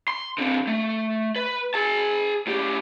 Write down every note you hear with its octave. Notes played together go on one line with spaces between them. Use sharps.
C6
D3 C4
A3
B4
G#4 A5
A2 G4